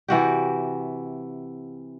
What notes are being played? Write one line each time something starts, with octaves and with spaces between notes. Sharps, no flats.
C3 E3 F#4 G4